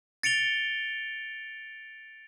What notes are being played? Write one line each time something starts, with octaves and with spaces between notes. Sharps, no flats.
A6 C#7 D7 F7 G7